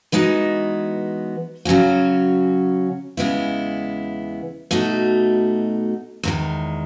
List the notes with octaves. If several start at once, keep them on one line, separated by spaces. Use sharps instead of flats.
E3 G#3 B3 D#4 F#4
C#3 F#3 C#4 F#4
E2 C#3 G#3 B3 E4
B2 A3 D#4 F#4
E2 D#3 G#3